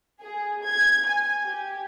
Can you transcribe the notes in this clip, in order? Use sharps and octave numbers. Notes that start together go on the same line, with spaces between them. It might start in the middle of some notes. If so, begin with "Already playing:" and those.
G#4
G#6
G#5
G4